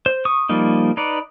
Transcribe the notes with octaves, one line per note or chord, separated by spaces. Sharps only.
C5
C#6 D#6
F3 G3 A#3 D#4
D#4 B4 D5